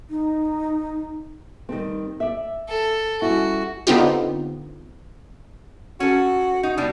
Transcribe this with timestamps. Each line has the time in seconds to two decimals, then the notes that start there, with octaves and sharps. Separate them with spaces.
0.10 D#4
1.69 D#3 G3 C4
2.20 D5 E5
2.69 A4
3.22 G3 C#4 E4 F#4
3.87 D3 B3 C4 D#4 F4 G4
6.00 C#4 F#4 A4
6.63 D#4 F#4
6.77 B2 G3 D4